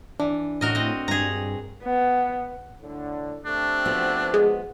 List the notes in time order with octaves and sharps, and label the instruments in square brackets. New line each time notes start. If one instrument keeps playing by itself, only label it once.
[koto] E3 [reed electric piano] D4
[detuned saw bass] A2 [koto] F#4 A#4 D#5
[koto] C4 D#5
[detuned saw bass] G2 [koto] G#4 A#5
[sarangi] B3
[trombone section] A2 D3
[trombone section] A3 C4 G4 [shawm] D4
[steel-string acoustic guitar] F3 B3 F#4
[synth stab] G#3